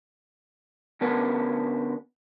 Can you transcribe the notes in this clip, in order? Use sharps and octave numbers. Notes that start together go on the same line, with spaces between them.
D3 B3 C#4 D4 A#4 B4